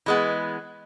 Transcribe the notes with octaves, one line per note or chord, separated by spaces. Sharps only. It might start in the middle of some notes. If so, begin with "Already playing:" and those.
E3 G#3 B3